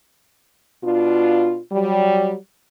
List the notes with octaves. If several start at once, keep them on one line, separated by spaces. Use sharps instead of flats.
B2 D4 F4
F#3 G3